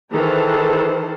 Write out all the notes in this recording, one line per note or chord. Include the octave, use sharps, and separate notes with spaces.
D#3 E3 G#4 A4 C5 A5